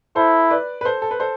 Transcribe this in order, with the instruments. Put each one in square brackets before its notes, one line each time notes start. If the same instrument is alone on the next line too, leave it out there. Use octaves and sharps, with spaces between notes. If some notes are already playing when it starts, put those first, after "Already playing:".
[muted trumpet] E4 [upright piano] A4 C5
[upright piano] B4 D5
B4
A4 C5
A4
B4
A4 C5